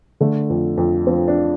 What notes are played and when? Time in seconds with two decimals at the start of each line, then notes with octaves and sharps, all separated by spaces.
0.20 D3 A3
0.50 F2
0.77 F2
1.07 F3 C4
1.28 D4